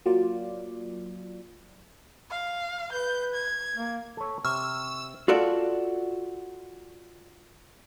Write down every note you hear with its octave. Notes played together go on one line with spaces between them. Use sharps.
F#3 A#3 F4 D5
F5
B4 G6
G#6
A#3
A4 C#5
C3 C#6 E6 F6
F4 F#4 A4 D5